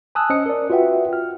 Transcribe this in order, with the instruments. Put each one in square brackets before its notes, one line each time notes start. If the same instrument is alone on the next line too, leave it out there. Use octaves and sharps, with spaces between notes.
[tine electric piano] G#5 A5 D#6 E6 F#6
C#4 C5 D#5 D#6 C#7
A#4 D5
F4 F#4 B4 E5 F#5 G5
F6